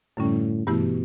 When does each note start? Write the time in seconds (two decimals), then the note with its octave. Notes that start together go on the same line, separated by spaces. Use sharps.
0.17 F#2 A2 D3 G3 C#4
0.67 G2 B2 E3 A3 E4 G4